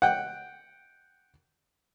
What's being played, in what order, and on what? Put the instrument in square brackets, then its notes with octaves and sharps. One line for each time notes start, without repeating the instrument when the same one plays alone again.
[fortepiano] F#5 G5